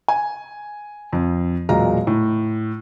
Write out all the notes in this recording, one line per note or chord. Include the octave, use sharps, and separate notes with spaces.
G#5
F2
E1 A#2 F#3 G#3 F5 A#5
A2